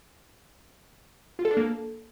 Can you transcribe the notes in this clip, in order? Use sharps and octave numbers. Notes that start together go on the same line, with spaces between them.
F4
A4
D4
A#3
A4